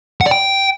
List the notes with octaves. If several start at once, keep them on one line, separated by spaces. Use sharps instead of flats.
F#5
D5
G5